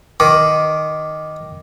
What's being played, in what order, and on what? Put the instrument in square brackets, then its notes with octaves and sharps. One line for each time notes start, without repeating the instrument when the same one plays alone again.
[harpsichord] D#3 [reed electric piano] D6